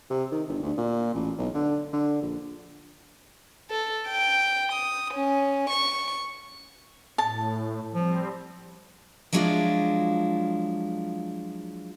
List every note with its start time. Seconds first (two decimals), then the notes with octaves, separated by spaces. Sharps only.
0.10 C3
0.32 D#3
0.48 G1
0.62 D2
0.77 A#2
1.14 A1
1.38 B1
1.54 D3
1.93 D3
2.22 A#1
3.70 A4
4.08 G5
4.72 D#6
5.14 C#4
5.70 C#6
7.18 A2 A5
7.94 F3 G3 C4
9.33 F3 F#3 G#3 D4 E4 F4